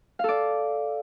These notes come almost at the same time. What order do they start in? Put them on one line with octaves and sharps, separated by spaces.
F5 A4 D5